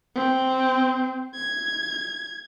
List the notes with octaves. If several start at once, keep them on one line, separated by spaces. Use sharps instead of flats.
C4
G#6